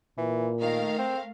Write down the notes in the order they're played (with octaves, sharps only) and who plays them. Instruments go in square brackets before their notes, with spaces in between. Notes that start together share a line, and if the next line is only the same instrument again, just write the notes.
[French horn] A#2 [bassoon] E3
[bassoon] D#3 [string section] A3 A#4 F5
[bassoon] C4